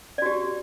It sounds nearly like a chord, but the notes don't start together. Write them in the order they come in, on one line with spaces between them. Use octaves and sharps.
D5 F#4 G4